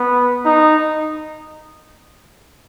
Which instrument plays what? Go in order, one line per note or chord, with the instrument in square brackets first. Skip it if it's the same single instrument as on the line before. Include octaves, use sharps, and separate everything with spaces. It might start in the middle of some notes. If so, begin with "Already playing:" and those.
Already playing: [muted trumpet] B3
D#4